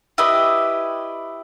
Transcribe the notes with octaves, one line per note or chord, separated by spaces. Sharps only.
E4 G4 B4 D#5